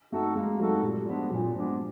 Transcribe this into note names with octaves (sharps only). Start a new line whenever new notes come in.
A3 D#4 F#4 A4
G#3 A#3
F#3 D#4 F#4 A4
A#2 G3
F3 G#3 B3 D4
A#2 F#3
F3 G#3 B3 D4